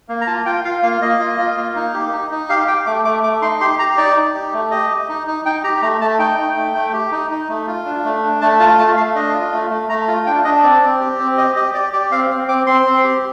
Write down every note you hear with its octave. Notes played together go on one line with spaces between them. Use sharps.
A#3
A#5
F4 A5
F4 G5
F4 F5
A#3 F5
A#3 D#5
F4
F4
A#3
D#4
G4
D#4
D#4
G4 F5
G4 G5
A3 D6
A3 D6
A3 D6
D#4 C6
G4 C6
G4 A#5
D#4 D5
D#4
G4
A3
G4 D#5
G4
D#4
D#4
D#4 G5
G4 A#5
A3 A#5
A3 A5
D#4 G5
D#4
A3
A3
G4
D#4
D#4
A3
F4
D4
A3
D4
A3 A5
F4 A5
A3 A5
A3 F5
D4 D#5
F4
A3
A3
A3 A#5
F4
D4 G5
D4 D#5
C4 D5
C4
G4
C4
G4 D#5
G4 D#5
G4 D5
G4 D5
C4 F5
C4
C4 D6
C4 C6
C4
G4